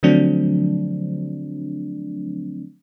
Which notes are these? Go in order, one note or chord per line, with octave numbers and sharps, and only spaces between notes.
D3 F3 F#3 A3 C4 D4